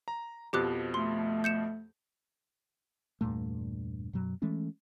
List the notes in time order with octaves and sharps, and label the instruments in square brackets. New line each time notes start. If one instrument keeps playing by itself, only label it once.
[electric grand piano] A#5
[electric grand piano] F2 B2 F3 [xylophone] G4 D6 F#6
[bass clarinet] A3 [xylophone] C6
[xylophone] G6 C#7 E7
[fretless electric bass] E2 G2 A#2 A3
F#2 B2 F#3
E3 G#3 A3 C#4